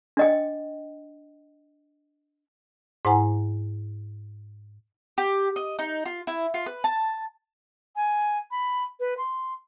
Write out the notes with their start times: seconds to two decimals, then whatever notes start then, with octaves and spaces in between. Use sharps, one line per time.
0.17 D4 D#5 G5
3.05 G#2 E4 C5 F#5 G#5 A#5
5.18 G4
5.56 D#5
5.79 D#4
6.05 F4
6.27 E4
6.54 F4
6.66 B4
6.84 A5
7.96 G#5
8.51 B5
9.00 B4
9.18 C6